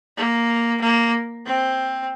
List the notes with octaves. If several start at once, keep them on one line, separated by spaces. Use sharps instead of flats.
A#3
A#3
C4